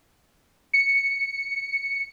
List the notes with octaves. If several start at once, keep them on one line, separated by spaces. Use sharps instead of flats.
C#7